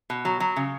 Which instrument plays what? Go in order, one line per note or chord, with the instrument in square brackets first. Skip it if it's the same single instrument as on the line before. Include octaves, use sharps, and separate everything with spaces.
[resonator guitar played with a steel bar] B2
F#3
F#3
C#3